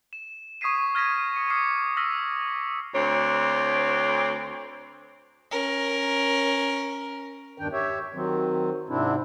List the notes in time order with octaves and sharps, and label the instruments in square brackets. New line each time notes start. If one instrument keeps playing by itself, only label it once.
[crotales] E7
C#6 D#6 G#6 B6 C7 D#7
F6 G#6 A#6 B6 D#7
D#6 C#7
D6 D#6 F6 C7 C#7 D#7
E6 F6 A#6 B6
[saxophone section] D2 C4 C#5
[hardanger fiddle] C#4 A#4
[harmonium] E2 G2 D#3 D4 G5
G4 C#5 E5
D#3 F#3 C4
G#2 C3 C4 D4 E4